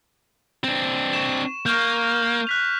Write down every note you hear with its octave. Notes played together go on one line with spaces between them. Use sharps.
C4 D4
C#6 E7
A#3 C#6 F6 G6
F#6 B6 F7